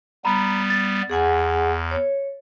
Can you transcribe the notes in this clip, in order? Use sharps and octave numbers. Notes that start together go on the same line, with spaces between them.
G3 B3 A#5 B5
A6
E2 G#4 F#5 G#5
C#5